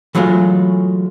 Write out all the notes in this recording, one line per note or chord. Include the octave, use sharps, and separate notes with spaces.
E3 F#3 G#3 A3 F4